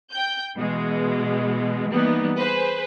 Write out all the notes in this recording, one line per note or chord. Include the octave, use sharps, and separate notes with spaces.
G5 G6
B2 E3 G#3
E3 G3 A#3 B3 D#4
G#4 B4 C5